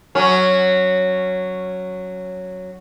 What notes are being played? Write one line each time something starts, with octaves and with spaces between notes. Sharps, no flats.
F#3 C#4